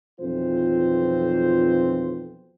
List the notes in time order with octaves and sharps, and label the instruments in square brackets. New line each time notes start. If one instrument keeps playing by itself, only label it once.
[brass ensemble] B1 F2 E3 C4 F4 C5